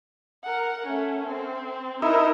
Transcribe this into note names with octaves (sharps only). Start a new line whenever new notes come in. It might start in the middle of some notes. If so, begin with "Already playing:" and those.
A#4 F#5
A3 C#4
C4
D#4 E4 A#4